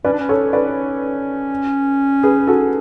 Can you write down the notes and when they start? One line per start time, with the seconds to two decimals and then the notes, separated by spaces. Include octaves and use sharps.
0.04 C#4 B4 D5
0.13 D4
0.19 C#4
0.29 A4 C#5
0.53 B4 D5
2.23 G#4 B4
2.47 F#4 A4